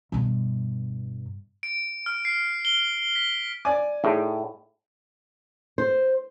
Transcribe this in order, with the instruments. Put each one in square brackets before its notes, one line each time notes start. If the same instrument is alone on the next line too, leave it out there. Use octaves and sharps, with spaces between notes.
[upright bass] G2 B2
[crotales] D7
F6
C7
G7
B6
[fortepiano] D5 G#5 [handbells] D6
[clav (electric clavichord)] A2 [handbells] D#4 G#4
[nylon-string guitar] C5